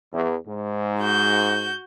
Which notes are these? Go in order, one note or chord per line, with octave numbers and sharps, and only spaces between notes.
E2
G#2
F#4 G6